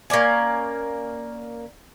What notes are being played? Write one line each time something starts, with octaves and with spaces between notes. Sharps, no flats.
A#3 C#4 D5 G#5